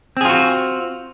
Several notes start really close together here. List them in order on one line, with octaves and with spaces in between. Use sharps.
C4 G#4 F4 F#4